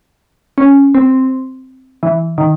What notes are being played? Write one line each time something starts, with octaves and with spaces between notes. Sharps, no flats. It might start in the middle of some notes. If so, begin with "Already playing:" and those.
C#4
C4
E3
D#3